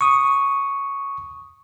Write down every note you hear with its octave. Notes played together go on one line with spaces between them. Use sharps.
C#6 D#6